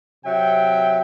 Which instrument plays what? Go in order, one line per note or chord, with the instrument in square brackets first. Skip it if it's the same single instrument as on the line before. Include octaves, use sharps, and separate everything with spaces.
[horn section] C3 F#3 E5 G5